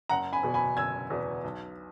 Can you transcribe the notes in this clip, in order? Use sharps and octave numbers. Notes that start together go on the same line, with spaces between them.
F#1 F#5 A#5
G#5 B5
E2 B2
G#5 B5
F#1 E6 G#6
E2 B2
B1